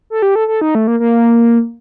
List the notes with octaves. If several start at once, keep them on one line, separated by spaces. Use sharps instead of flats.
A4
G4
A4
A4
D#4
A3
A#3
A#3